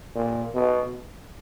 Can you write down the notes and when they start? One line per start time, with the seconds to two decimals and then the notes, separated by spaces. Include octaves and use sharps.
0.15 A#2
0.55 B2